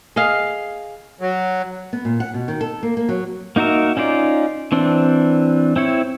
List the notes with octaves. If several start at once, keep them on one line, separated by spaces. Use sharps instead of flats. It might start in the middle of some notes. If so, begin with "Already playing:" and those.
G#4 D#5 F5
F#3
B3
A#2
F#5
B2
D#3
A4
A#3
A#3
F#3
A#3 D#4 F#4 A#4 E5
C#4 D#4 F4 D5
E3 C4 D4
C4 E4 C#5